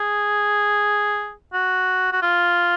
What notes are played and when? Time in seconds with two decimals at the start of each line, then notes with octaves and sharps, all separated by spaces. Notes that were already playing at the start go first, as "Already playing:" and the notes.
Already playing: G#4
1.53 F#4
2.12 F#4
2.22 F4